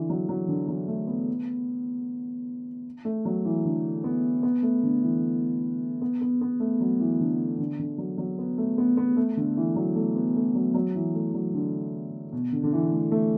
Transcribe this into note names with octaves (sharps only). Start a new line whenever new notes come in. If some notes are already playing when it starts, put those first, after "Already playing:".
Already playing: D3 E3
F#3
F#3
D3
F#3
A3
B3
A3
F#3
E3
D3
B3
B3
A3
D3
E3
B3
B3
B3
A3
F#3
E3
D3
D3
D3
F#3
F#3
B3
A3
B3
B3
A3
D3
E3
F#3
A3
B3
A3
F#3
F#3
E3
A3
F#3
D3
B2
D3
D3
E3
A3
A3